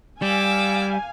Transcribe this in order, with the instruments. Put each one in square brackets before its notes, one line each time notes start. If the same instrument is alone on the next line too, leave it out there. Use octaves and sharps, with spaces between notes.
[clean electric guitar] G3 [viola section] F5 G#5 [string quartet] D6 E6